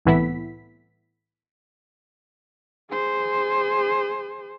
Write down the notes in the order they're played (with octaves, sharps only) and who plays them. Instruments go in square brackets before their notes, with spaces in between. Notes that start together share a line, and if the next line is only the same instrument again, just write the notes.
[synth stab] C2 A2 E3 B3 E4 B6
[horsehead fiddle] G#4 C5